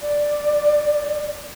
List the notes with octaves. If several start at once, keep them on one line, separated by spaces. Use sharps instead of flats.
D5